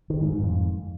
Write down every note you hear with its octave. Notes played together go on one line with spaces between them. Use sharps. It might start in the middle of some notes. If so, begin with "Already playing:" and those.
D#3
G#2
G#2
F2